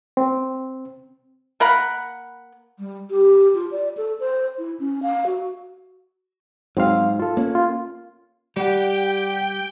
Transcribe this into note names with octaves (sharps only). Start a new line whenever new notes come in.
C4
A#3 A#4 F#5 B5
G3
G4
F4
D5
A4
C5
E4
C#4
F5
F#4
G#2 F#3 C4 F5
F4 A4
A#3 C#4
F4
G3 G4 D5 F#5 G5